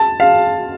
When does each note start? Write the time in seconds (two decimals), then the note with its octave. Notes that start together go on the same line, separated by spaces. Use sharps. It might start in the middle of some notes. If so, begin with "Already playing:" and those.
Already playing: A5
0.20 F5